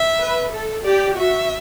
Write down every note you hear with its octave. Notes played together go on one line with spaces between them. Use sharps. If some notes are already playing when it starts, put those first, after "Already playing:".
Already playing: E5
B4
A4
G4 D5
F#4 E5